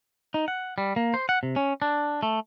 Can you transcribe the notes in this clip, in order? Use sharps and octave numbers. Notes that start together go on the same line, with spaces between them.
D#4
F#5
G3
A#3
C5
F#5
C3
C#4
D4
A3